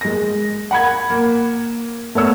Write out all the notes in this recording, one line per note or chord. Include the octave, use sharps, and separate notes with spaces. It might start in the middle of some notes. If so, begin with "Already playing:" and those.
G#3 A#6
F#5 B5 G#6
A#3
A3 B3 C#5 E6